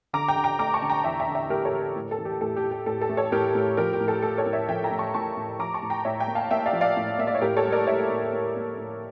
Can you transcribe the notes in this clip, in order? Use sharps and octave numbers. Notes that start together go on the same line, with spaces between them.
D3 A#5 D6
G5 A#5
D3
G5 A#5
A3 A#5 D6
A5 C#6
D3
G5 A#5
E2 E5 G5
E5 G5
D3
E5 G5
A3 G4 A#4
A4 C#5
D3
A2
A4
E3
G4
A2 A4
G4
A2
G4
A2 A4
A4
A3
A4 C#5
A2 G4 A#4
A2
F3 G4 A#4
G4
A2
A4
A3 A4
A4 C#5
A2
C#5 E5
F3 E5 G5
G5 A#5
A2
A5 C#6
A2 A5 C#6
A2
F3 A#5 D6
A5 C#6
A2
G5 A#5
A2 C#5 E5
E5 G5
A#3
F5 A5
A#3 E5 G5
D5 F5
F3
D5 F5
A2
A#3 E5
D5
C#5
A2 G4 A#4
A4 C#5
G3
A#4 D5
G3 C#5 E5
A2
A2
A#3
A2